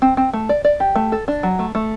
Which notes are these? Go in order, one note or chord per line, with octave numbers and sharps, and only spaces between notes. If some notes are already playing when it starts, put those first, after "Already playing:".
C4
C4
A3
D5
D5
G4
A3
A4
D4
F#3
A3
A3